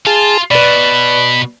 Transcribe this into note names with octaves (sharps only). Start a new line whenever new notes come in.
F4 G#4 A5
B2 B4 D5 B5